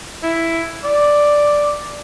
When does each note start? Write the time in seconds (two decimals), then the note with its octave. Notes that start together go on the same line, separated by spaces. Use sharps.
0.23 E4
0.84 D5